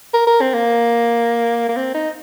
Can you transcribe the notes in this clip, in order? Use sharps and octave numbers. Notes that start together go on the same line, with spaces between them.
A#4
A#4
C4
A#3
A#3
C4
D#4